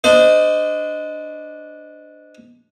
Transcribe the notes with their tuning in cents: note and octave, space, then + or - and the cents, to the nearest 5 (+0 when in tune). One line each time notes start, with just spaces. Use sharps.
D4 +0 C5 -35 D#5 +0